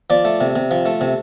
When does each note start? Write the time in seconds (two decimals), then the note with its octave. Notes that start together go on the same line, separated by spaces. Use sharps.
0.10 F3 D5
0.25 A3
0.41 C3
0.56 C3
0.71 F3
0.86 A3
1.01 C3